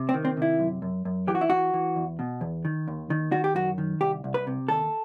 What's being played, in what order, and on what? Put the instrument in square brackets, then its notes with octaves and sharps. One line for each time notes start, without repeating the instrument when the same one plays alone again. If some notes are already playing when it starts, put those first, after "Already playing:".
Already playing: [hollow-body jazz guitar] C3
C4
D#3
C4
C3 E4
F#2
F#2
F#2
E3 G4
F#4
E4
E3 F#4
E3
E2
B2
E2
D#3
D#2
D#3
D#3 F#4
G4
F#2 F#4
D#3
C2 G4
C2
B4
C3
D#2 A4